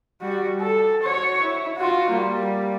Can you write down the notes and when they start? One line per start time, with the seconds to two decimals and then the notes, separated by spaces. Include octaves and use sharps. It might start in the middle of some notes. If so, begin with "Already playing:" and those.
0.21 G3 F#4
0.61 A4
1.03 F#4 C#5
1.42 E4
1.77 F4 F#4
2.10 G3 A#3